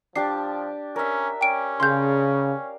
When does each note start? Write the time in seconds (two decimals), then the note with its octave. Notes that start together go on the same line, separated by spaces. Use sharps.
0.16 F3 D4 G4 D5 C7
0.96 C#4 A#4 E5
1.41 C#4 G5 D7
1.80 C#3 F5 G5 C6 G6